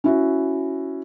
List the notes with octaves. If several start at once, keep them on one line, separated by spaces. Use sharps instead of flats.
C#4 E4 F#4